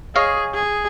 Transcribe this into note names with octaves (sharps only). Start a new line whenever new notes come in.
G#4 C#5 D#5 F5
G#4